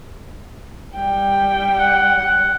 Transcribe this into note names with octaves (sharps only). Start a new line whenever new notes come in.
G3 G5
F#5